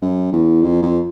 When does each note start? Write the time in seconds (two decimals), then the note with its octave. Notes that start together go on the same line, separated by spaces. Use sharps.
0.02 F#2
0.32 E2
0.62 F2
0.82 F2